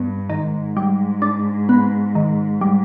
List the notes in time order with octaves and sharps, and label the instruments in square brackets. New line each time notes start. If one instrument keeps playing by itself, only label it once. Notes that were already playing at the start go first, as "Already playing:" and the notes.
Already playing: [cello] G2 [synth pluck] B3
[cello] G#2 [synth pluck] D#3
[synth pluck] G3
D4
B3
D#3
G3